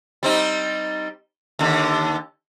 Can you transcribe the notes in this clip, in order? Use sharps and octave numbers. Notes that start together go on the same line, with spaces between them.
G3 C4 D#4
D#2 D3